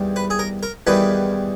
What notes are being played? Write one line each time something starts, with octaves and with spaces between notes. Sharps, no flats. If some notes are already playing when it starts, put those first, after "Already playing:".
Already playing: E2 D#3 G3
B4
G#4
A#4
A#4
E2 D#3 G3 B4